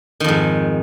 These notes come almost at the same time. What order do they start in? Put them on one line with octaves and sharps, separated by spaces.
D#3 F2 G#2